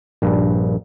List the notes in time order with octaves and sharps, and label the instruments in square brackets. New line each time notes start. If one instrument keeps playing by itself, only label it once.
[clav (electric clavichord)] A#1 G2